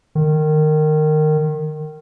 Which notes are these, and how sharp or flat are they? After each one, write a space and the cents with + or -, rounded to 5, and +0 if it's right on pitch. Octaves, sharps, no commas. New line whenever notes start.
D#3 -20